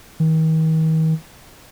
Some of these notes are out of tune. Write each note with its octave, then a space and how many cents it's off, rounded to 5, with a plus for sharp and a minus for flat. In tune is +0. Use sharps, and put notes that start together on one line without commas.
D#3 +40